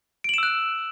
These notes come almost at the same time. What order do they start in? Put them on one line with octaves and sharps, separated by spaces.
D7 F#7 E7 E6 F#6